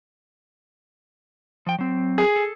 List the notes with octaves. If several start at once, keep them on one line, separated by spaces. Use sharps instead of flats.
F3 G5
F#3 C4
G#4
A4